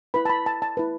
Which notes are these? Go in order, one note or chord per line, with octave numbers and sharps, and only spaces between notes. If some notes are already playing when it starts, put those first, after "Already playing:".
E4 B4 B5
A5
B5
A5
A5
E4 B4